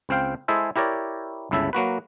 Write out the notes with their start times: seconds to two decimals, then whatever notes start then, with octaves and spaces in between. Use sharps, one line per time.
0.09 C#2 C4 C5 F5 G5
0.48 G#3 E4 G#4 A4 C5 E5
0.76 E4 G4 A#4 C#5 D5
1.51 G1 C#2 C#3 E4 A4 E5
1.73 F#3 A#3 F#4 B4